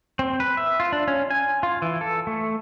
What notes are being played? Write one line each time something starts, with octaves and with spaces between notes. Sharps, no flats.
C4
B4
E5
F4
D4
C#4
G#5
F4
E3
A4
A3